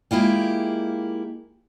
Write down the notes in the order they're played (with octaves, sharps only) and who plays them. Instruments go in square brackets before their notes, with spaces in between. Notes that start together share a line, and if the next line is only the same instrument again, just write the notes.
[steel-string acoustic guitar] G#3 A#3 E4 F4 G4